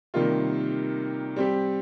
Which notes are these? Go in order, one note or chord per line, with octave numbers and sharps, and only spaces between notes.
C3 D#3 G3 A#3 F4
G3 C4 G4